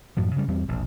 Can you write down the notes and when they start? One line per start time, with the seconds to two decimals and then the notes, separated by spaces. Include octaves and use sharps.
0.17 F#2 A2 F3
0.36 C#3 G3
0.48 E2 G3 C4
0.68 E1 A#1